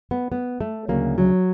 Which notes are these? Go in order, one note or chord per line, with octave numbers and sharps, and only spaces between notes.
B3
B3
A3
D2 C#3 F#3 A#3
F#3